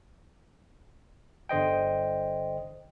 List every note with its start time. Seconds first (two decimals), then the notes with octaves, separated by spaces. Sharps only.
1.49 G1 D3 C5 D#5 G5